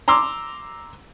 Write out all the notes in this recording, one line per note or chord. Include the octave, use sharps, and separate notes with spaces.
A#5 C6 D6 E6